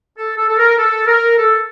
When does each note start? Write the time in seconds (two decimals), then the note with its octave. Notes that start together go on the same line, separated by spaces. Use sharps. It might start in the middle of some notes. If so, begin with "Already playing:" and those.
0.18 A4
0.37 A4
0.49 A4
0.58 A#4
0.78 A4
1.07 A#4
1.37 A4